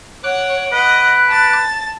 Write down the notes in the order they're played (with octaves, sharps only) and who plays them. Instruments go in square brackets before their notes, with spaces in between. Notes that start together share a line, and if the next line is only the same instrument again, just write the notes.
[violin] C#5 F#5 [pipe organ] D6 F#6
[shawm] B4 [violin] D#5 F#5
[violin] A5 A6